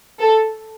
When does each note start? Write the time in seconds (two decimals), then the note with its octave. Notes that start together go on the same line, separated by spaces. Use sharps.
0.19 A4